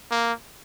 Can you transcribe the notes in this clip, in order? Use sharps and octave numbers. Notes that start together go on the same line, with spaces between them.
A#3